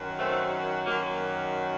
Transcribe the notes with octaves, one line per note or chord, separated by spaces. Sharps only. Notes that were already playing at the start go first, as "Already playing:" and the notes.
Already playing: F#2 D#3 F#3
A3 C4
F#2 D#3 F#3 A#3
A#3